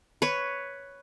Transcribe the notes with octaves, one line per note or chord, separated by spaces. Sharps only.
B4 C#5